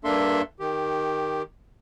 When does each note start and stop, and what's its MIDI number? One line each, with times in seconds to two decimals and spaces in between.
0.05 0.42 43
0.05 0.42 58
0.05 0.42 62
0.05 0.42 69
0.05 0.42 76
0.05 0.42 84
0.60 1.42 51
0.60 1.42 67